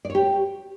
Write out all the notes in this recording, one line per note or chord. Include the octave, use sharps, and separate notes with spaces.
D5
C#5
G4